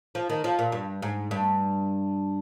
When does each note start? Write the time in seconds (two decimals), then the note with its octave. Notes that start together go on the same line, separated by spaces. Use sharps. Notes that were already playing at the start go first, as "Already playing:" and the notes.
0.15 F3
0.30 D#3
0.44 F3
0.59 A#2
0.72 G2
1.02 G#2
1.31 G2